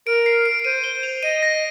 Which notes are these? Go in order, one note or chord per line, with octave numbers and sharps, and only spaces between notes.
A#4 D7
C7
D7
D7
C5 D#7
G7
F7
D#5 D#7
A#6